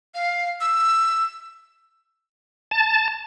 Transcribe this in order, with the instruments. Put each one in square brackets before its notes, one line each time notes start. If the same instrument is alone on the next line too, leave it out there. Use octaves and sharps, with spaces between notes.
[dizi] F5
E6
[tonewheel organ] A5